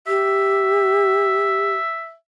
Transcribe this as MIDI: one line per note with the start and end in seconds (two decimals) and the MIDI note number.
0.07 1.73 67
0.07 2.15 76